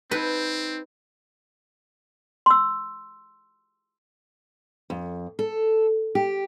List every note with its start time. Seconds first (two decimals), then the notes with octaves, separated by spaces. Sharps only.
0.11 C4 D#4 B4 G6
2.46 C6 E6
4.90 F2
5.39 A4
6.15 G4